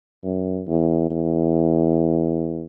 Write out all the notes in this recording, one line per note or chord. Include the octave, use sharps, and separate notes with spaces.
F#2
E2
E2